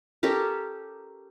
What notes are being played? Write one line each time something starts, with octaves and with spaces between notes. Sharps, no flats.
C#4 G4 A4 A#4